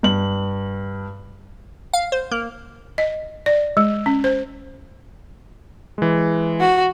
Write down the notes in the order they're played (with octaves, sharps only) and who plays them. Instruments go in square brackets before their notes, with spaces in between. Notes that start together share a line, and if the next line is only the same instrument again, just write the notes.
[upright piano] G2 F#7
[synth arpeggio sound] F5
C5
A#3
[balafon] D#5
D5
G#3
C#4
C5
[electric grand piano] E3 G#3
[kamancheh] F#4